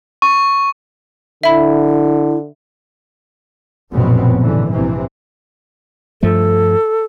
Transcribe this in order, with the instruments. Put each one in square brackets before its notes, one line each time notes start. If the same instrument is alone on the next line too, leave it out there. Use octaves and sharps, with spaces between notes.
[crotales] C#6
[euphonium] D3 [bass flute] E4 [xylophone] E5 B5
[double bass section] F1 A#1 F#2 B2 B3 C4
G#2 D3 E3
A#1 C3 E3 C4
[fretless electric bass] G2 F3 A3 [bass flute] A4